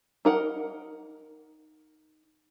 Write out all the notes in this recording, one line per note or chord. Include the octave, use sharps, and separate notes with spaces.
D#4 A#4 F#5